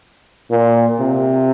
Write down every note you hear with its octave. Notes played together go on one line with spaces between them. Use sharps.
A#2
C3